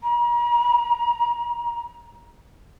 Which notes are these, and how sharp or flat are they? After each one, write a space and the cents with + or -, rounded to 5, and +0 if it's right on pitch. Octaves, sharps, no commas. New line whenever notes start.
A#5 +40